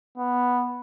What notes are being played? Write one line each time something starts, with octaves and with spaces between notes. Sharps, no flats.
B3